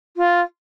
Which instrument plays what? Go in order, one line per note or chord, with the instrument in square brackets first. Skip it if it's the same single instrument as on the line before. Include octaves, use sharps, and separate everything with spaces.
[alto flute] F4